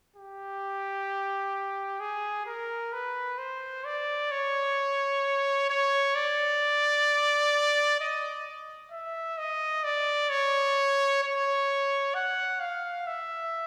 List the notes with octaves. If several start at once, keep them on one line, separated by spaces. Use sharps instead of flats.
G4
G#4
A#4
B4
C5
D5
C#5
C#5
D5
D#5
E5
D#5
D5
C#5
C#5
F#5
F5
E5